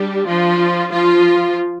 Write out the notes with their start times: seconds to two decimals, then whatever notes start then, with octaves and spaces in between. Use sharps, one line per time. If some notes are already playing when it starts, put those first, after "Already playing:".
Already playing: G3 D4 G4
0.27 F3 F4
0.92 F3 F4